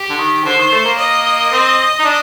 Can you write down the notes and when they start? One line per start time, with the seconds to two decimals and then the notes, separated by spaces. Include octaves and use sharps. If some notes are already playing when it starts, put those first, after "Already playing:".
Already playing: G4
0.09 D3
0.18 D#3
0.45 D3 C5
0.57 D#3
0.72 A3
0.84 A#3
0.98 D#5
1.52 C4
1.99 D#4
2.05 D4